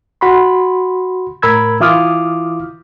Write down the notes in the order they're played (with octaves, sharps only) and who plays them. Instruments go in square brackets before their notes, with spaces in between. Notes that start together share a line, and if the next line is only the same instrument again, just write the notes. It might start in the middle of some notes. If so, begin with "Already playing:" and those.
[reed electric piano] F#4 B5 C6
A2 A#4 B5 E6 G#6
E3 E4 F4 D6 D#6 F6